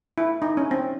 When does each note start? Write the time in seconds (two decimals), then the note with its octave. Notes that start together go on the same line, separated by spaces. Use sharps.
0.18 E4
0.42 D#4
0.57 C#4
0.71 C4